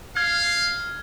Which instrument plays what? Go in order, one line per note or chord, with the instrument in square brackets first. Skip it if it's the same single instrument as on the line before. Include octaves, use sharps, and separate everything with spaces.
[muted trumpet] F5 [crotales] F6 G#6